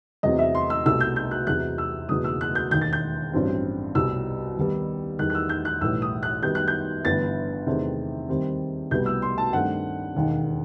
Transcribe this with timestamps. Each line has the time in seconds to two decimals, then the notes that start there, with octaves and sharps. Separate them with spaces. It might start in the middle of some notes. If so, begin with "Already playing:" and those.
0.23 E2 C3 F#3 C4 D#5
0.39 E5
0.55 C6
0.70 E6
0.85 C2 B2 A3 E6
1.00 G6
1.16 G6
1.31 F#6
1.47 E2 C3 F#3 F#6
1.78 E6
2.09 F#1 E2 B2 D#6
2.24 E6
2.41 F#6
2.55 G6
2.71 E1 D#2 D#3 G6
2.81 A6
2.93 G6
3.33 A1 G2 F#3 C4
3.95 C2 B2 G3 E6
4.57 D#2 D#3 G3 B3
5.19 E2 D#3 G3 F#6
5.30 F#6
5.35 E6
5.49 G6
5.65 F#6
5.81 B1 A2 E3 G3 E6
6.02 D#6
6.23 F#6
6.43 F#2 D#3 G3 B3 G6
6.55 F#6
6.68 G6
7.05 G1 G2 E3 B3 A6
7.67 E2 C3 D#3 A3 C4
8.29 D#2 D#3 G3 C4
8.91 C2 B2 G3 B3 G6
9.06 E6
9.22 C6
9.38 A5
9.53 G2 D#3 A3 C4 F#5
10.14 E1 D#2 D#3